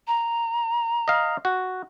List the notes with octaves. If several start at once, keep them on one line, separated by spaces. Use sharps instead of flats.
A#5
D#5 F5
F#4